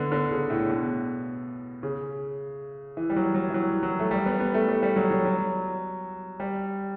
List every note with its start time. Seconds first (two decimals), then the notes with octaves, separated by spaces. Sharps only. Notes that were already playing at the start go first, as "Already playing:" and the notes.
Already playing: D3 A3 B3
0.12 D3
0.31 C#3
0.50 A2
0.69 B2
1.83 C#3
2.97 E3
3.10 G3
3.16 F#3
3.35 F#3
3.50 E3
3.54 F#3
3.83 F#3
3.99 A3
4.11 G3
4.26 B3
4.40 B3
4.54 A3
4.68 G3
4.82 G3
4.96 F#3
5.11 F#3
5.25 F#3
6.40 G3